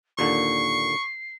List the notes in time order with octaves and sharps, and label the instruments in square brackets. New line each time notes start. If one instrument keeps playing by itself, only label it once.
[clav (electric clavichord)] D#2 A#2 D3 [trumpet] C#6 [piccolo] C7